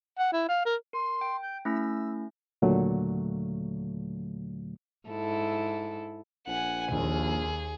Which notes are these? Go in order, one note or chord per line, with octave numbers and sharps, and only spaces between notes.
F#5
E4
F5
A#4
A#4 C6
G5
G6
A3 C#4 E4 E6
D#2 A#2 D3 F#3 A3
G#2 E4 A4
A#1 F#5 G#5
A#1 D#2 G#4